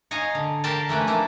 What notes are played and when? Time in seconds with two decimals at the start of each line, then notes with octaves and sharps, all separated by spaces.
0.11 C#5 D#5 F5 G#5 A#5
0.35 D3
0.64 G4 A#4 D5 F5 G5 A5
0.89 A3 A#3 C#4 B4
1.07 F3 A#3 D4 E4